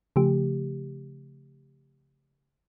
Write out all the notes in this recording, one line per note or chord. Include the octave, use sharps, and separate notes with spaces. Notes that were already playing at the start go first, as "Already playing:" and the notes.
C#3 F3 A3 G4